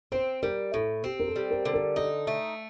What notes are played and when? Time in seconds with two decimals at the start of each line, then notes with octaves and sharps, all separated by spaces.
0.12 C4 C5
0.43 G3 A#4
0.74 A2 A4
1.04 C4 G4
1.20 A#4
1.28 A4
1.36 G3
1.51 A#4
1.65 D3
1.74 A#4
1.96 D#4 A4
2.27 A3